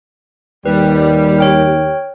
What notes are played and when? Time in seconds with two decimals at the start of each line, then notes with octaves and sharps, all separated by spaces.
0.66 D#2 G3 B4
1.38 C#5 G5 F6